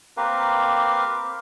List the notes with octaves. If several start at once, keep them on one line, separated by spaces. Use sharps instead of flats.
A#3 C4 G4 A#4 B4 F5